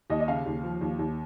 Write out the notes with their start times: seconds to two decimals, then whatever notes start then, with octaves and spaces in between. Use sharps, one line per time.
0.10 D#2 D#5
0.20 D#5
0.28 C#3 F5
0.46 D#2
0.63 F3
0.81 D#2
0.99 D#2